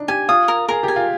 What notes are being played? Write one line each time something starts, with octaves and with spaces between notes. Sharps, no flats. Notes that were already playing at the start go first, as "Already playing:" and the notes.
Already playing: D4 D#4
G4 G#5
F4 D#6
A#4
G#4 A#4
G4 G#5
F4